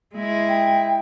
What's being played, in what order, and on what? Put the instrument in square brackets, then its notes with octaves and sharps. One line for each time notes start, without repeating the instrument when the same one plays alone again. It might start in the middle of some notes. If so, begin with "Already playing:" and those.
[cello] G#3 E4
[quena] G5